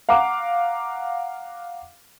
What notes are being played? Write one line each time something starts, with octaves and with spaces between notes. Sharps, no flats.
F5 F#5 A#5 D6